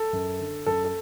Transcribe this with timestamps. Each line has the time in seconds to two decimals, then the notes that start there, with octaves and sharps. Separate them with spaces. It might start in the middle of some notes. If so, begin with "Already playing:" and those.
Already playing: A4
0.13 F#2
0.39 D3
0.66 F#2 A4
0.85 A4